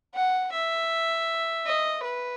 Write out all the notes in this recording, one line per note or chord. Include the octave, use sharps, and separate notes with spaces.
F#5
E5
D#5
B4